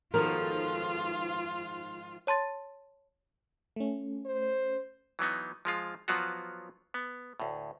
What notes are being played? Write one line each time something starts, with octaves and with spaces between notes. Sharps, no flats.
G#2 D#3 F3 B3 F4 F#4 A4 A#4
C#5 A5 C6 A6
A3 C#4
C5
E3 F#3 B3 D#4
F3 G#3 F4
F3 F#3 B3 F4 F#4
B3
D2 A2